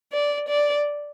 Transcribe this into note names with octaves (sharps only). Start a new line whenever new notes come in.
D5
D5